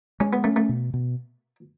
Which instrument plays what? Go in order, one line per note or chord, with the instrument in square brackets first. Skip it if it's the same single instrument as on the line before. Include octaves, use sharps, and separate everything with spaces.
[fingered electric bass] G#3 [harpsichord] C#4
[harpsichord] B3
[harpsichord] A3 [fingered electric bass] C#4
[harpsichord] A3
[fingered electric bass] B2
B2